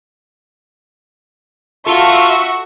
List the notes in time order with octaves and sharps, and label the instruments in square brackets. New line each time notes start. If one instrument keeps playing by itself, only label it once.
[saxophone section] F4 [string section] F#4 C#6 [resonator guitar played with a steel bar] A4 [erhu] E5